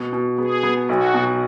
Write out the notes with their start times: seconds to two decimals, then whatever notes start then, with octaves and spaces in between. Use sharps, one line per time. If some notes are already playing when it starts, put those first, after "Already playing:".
Already playing: B2
0.13 B2
0.38 B3 G#4
0.63 B3
0.89 B1 F#4
1.14 B2